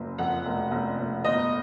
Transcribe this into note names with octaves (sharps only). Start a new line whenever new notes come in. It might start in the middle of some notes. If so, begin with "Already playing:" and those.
Already playing: F#1 F#2
F2 F#5
F1
F1
F1
G1 D#5